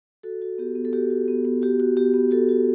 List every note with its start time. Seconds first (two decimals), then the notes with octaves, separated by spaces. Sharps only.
0.23 F#4 A4
0.42 F#4
0.58 B3 G4
0.75 B3
0.85 A4
0.93 F#4 G4
1.10 F#4
1.28 B3
1.45 B3
1.62 F#4 G4
1.80 F#4
1.97 B3 G4
2.14 B3
2.31 F#4 A4
2.49 F#4